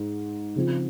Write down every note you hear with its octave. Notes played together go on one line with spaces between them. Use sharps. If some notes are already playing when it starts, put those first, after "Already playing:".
Already playing: G#2
C#3 F3 C4 F4